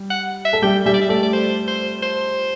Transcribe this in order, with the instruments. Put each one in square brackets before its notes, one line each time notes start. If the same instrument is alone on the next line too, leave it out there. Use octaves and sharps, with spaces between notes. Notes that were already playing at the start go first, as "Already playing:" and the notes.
Already playing: [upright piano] G3
[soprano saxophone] F#5
E5
[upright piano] A4
[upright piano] G3 G4 [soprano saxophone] G5
[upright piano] G3 G4 [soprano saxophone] E5
[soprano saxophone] D5
E5
[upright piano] A3 A4 [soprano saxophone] D5
[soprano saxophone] D5
C5
C5
C5